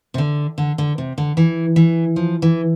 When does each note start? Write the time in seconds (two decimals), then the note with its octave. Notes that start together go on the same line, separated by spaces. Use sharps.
0.14 C3
0.18 D3
0.58 D3
0.78 D3
0.98 C3
1.18 D3
1.37 E3
1.76 E3
2.16 F3
2.42 E3